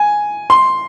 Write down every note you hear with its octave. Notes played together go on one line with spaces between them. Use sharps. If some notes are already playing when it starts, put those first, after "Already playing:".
Already playing: G#5
C6